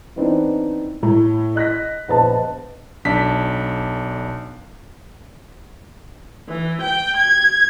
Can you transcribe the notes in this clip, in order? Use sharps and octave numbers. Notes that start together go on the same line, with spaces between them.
E3 B3 C4 D4 D#4
A2
D#5 F#6 A#6 B6
A#1 B3 B4 C5 D#5 A5
B1 D4 A5 B6
E3
G5
G#6